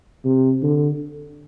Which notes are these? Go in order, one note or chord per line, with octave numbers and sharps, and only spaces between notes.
C3
D3